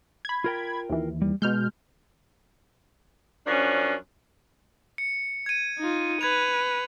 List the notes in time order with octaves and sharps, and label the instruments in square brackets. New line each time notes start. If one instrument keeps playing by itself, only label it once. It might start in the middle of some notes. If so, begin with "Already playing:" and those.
[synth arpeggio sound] B5 G#6
[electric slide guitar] F4 A#4 G5
[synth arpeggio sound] D#2 E3
[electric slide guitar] G3
[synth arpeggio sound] B2 F6 G6 [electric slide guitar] G#3
[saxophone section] F#2 F3 C#4 D4
[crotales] C#7
G#6 D#7
[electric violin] D#4 F4
[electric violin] B4 [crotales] G#6 D#7 F7